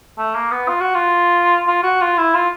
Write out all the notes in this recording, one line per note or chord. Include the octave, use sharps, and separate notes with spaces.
A3
A#3
B3
F4
F#4
F4
F4
F#4
F4
E4
F4